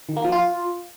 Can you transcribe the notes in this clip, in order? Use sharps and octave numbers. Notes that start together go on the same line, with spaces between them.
D#3
A#3
F3
F4